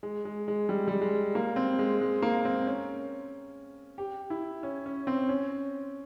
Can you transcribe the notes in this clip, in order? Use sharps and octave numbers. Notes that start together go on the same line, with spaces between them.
G#3
G#3
G#3
G3
G3
G#3
A#3
C4
G#3
G#3
A#3
C4
C#4
G4
E4
C#4
C#4
C4
C#4